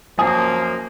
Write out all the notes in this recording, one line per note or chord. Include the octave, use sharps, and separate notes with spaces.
F#2 F3 A#3 G#5 D#6